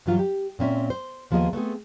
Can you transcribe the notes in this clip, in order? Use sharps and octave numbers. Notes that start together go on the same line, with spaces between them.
G2 E3 F#3 F4
G4
A#2 C4 C#4 E5
C5
D#2 F3 A#3 B3 G#4 D#5
A3 B3 C4 G#4